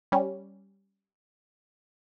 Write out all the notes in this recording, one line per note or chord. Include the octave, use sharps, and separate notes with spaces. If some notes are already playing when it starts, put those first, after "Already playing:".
G3 C#4